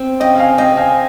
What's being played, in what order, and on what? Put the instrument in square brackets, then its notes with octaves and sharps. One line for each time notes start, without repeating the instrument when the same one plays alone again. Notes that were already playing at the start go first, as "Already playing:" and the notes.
Already playing: [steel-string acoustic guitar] C4
[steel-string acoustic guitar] C#3 [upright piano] D#5 G5
[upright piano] F5 G#5
[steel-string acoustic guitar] C4 [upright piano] D#5 G5
[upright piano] F5 G#5